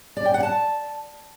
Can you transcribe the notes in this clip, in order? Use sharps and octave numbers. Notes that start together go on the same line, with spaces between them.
D5
G5
F#5
A5